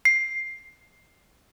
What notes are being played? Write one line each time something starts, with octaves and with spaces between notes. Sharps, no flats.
C7